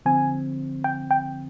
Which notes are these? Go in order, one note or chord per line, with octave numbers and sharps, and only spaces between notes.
D3 F3 C4 G#5
G5
G5